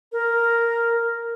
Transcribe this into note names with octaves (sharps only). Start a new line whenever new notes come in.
A#4